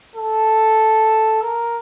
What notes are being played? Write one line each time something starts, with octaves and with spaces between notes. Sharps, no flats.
A4
A#4